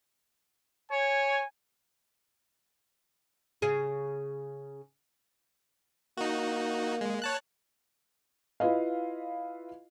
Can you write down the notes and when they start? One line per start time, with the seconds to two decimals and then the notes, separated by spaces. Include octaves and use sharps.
0.91 C#5 G#5
3.62 C#3 G#4
6.17 A#3 D#4 F#4
7.01 G#3
7.22 C#5 A5 F#6
8.60 E4 F4 B4 D#5 F5